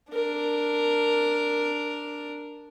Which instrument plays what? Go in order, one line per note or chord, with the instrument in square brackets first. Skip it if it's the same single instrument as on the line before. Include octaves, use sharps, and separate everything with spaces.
[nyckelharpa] D4 A#4